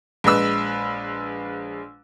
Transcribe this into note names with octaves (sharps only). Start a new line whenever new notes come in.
A#1 G#3 B4 E6